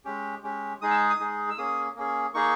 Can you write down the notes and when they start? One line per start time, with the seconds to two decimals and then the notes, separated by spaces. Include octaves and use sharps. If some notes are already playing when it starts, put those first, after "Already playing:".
0.05 G#3 C#4 G4
0.43 G#3 C#4 G4
0.81 G#3 D#4 G#4 D#6
0.91 E6
1.10 D#6
1.20 G#3 D#4 G#4
1.50 E6
1.58 A#3 C#4 G#4 D#6
1.96 A#3 C#4 G#4
2.34 A#3 D#4 G#4 C#6